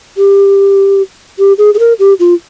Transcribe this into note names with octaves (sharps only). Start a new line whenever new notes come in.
G4
G4
G#4
G#4
A#4
G4
F4